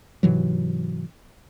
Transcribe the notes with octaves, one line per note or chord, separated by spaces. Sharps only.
G#2 C3 E3 F#3